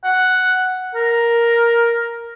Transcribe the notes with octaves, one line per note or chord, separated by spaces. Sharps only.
F#5
A#4